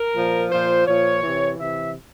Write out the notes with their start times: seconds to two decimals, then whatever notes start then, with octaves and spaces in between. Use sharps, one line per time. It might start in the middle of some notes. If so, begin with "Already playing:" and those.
Already playing: A#4
0.14 A#2 F3
0.50 A#2 F3 C5
0.86 A#2 F3 C#5
1.22 C3 E3
1.58 C3 E3 E5